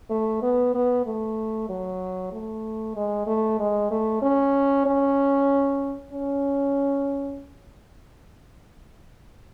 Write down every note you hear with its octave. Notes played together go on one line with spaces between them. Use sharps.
A3
B3
B3
A3
F#3
A3
G#3
A3
G#3
A3
C#4
C#4
C#4